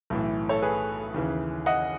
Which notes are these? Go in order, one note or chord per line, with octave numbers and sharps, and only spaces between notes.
B1 A2 E3
A4 C#5
G#4 B4
D#2 C#3 E3
D#5 F#5